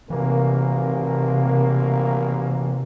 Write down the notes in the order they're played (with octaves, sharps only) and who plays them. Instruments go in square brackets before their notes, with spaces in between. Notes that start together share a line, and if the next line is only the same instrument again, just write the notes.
[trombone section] G#1 A3 A#3 [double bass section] C3 [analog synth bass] E3